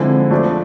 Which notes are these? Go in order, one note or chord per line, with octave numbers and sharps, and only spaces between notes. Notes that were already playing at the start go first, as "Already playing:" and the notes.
Already playing: D3 F3 G#3 C4 E4
F3 A3 D4